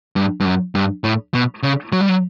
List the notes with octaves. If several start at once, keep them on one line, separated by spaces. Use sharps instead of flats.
G2
G2
F#2
G2
A2
B2
C#3
F#3
G3
F#3